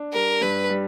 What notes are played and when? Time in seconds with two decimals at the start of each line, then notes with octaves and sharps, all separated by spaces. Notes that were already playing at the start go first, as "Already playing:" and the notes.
Already playing: D4
0.13 G3 A#4
0.41 G2 B4
0.70 G3